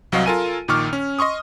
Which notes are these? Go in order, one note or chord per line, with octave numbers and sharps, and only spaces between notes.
C2 F#3 C4 F#4 D#5 F5
F4 A4 A#4 G#5 D#7
A#1 A#2 D#3 C#6 D6 F6
C#4
D#5 C6 C#6 D#6